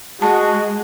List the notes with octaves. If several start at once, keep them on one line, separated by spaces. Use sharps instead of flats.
G#3 F#4 A5